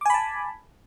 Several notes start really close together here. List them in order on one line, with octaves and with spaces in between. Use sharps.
D6 G#5 B5 A5